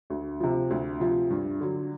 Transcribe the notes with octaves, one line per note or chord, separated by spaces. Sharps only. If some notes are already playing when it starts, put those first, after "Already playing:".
D2
C3 F3
D2
C3 F3
G2
D3 F#3